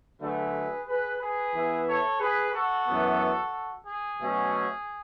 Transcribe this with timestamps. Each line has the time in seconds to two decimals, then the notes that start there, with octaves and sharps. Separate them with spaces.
0.20 D3 F#3 A3 G#4 B4
0.87 G#4 B4
1.20 G#4 B4
1.54 E3 B3 E4
1.87 A4 C#5
2.20 G#4 B4
2.53 F#4 A4
2.86 F#2 E3 B3
3.86 G#4
4.19 B2 F#3 A3 C#4